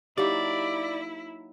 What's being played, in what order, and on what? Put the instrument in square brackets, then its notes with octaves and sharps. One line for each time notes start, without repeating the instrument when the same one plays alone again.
[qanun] F#3 A#3 D#4 [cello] E4 [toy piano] G4 D6 [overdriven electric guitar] D5